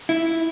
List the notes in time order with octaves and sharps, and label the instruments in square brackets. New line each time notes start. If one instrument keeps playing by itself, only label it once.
[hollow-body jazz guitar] E4